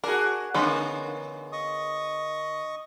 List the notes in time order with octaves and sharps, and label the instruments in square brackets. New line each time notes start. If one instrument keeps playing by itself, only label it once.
[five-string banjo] D4 [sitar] F#4 G#4 A#4
[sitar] D3 A#3 [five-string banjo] G#3 B3 C#4
[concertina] D#5 C#6 D#6